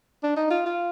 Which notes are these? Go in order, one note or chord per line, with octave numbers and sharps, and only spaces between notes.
D4
D#4
F4
F4